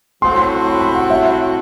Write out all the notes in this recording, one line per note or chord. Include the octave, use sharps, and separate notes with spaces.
A2 F#3 C4 F#4 C6
B5
B5
F#5
E5